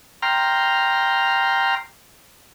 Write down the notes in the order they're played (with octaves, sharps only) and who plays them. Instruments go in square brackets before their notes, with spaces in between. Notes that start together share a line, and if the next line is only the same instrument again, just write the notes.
[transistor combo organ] G5 A#5 C6 F6